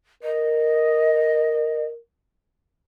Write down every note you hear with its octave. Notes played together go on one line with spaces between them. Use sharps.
A#4 D#5